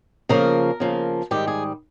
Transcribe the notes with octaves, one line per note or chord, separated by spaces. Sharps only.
C#3 F3 A#3 A#4
C#3 F3 A#3
G#2 D#3 G3 G4
G#4